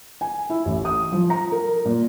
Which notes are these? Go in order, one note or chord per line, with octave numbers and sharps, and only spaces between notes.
G#5
E4
A1
D#6
F3
A#5
A#4
A#2